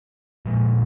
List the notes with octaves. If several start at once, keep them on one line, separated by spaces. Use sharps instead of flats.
A#2 F3 G#3